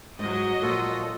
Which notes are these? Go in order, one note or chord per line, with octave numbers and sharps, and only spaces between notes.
G#2 F#3 D#5
A#2 F3 G#3 F4 F#4 A4